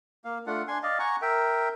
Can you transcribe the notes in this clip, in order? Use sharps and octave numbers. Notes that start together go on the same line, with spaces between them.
A#3 F5
A3 D4 F4 F#5
D4 G#5 C6
D5 D#5 F5
F#5 G#5 A#5 C#6
A#4 E5 G5